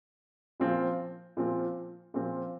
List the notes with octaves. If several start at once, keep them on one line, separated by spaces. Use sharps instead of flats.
A#2 F3 C4 F4
A#2 F3 C4 F4
A#2 F3 C4 F4